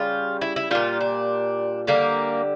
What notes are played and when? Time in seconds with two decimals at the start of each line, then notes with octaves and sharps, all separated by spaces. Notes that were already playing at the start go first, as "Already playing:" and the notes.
Already playing: C#3 G3 F4
0.41 E4
0.56 E4
0.71 A#2 G3 F4
1.01 D4
1.87 D3 G3 A#3